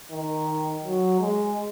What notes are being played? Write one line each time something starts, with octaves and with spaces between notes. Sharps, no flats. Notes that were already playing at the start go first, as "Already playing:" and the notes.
D#3
F#3
G#3